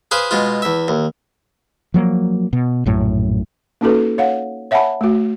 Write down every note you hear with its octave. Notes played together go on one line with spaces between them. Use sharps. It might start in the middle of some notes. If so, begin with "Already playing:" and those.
G#4 B4 C5 F5
B2 G#3 F4
E2 E5
D#2
F3 F#3 A#3
B2
A#1 F#2 A2
A#3 C#4 D#4 F#4 A4 B4
C#5 F5 F#5
C#5 E5 F#5 G#5 A5 B5
A3 F#4